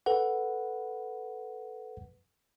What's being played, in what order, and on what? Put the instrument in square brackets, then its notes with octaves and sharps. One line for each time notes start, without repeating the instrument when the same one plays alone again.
[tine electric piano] A4 B4 F#5